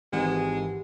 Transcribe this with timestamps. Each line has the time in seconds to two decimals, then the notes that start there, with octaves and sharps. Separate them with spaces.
0.12 G#1 G#2 D#3 E3 G#3 G4 F#5